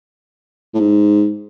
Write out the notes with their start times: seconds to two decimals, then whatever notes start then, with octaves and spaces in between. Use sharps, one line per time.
0.74 A2
0.80 G#2